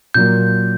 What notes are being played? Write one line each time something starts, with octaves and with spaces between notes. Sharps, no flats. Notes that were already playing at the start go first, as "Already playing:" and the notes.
A#2 F#3 A#3 G6